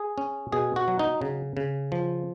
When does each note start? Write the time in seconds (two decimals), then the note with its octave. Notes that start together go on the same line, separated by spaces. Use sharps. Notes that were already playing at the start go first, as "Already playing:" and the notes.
Already playing: G#4
0.18 C#4
0.52 B2 G#4
0.76 F#4
0.88 F#3
0.99 D#4
1.21 C#3
1.57 C#3
1.92 F3